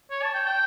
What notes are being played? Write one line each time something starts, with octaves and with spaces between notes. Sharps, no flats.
C#5
A5
G5
G5